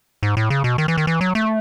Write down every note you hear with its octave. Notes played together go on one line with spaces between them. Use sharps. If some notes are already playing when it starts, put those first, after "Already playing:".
G#2
A2
C#3
B2
D#3
E3
D#3
E3
F#3
A3